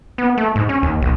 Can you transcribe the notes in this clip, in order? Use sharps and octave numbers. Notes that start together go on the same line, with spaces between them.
B3
A3
G#2
C#4
D#2
B1